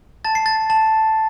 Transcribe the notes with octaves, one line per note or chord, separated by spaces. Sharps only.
A5 A6
C7
A6
A5